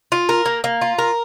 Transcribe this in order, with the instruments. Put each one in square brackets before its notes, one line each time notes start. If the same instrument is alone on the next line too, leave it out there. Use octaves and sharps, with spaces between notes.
[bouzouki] F4
A#4
A#3
A#3
F4
A#4